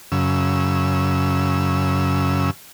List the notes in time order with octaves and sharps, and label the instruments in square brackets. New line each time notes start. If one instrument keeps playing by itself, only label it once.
[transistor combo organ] F#2 C#3 E6